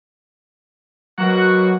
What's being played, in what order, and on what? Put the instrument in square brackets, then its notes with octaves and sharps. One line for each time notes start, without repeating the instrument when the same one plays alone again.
[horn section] B2 A#3 F#4 [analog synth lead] F#3